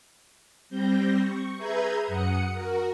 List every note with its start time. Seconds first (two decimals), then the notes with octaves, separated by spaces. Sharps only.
0.70 G3 C4 G6 A#6
1.19 C#6
1.57 G#4 B4 E5 A#5 G6 G#6
2.07 F#2 F#5 D#6 C#7
2.53 F#4 A#4